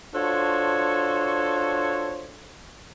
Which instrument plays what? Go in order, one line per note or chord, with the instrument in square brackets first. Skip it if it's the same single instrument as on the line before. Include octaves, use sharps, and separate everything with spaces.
[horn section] D4 F4 F#4 A4 C5 C#5